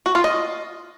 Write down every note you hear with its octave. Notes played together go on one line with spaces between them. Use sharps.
F#4
F4
D#5